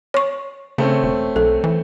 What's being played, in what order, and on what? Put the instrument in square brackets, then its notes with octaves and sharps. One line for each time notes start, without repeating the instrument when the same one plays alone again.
[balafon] C#5 C#6
[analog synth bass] C#3 [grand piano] A3 C4 C#4
[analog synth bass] E1
[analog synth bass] B1 [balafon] A4
[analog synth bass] E3